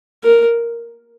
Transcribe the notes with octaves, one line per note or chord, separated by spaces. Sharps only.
A#4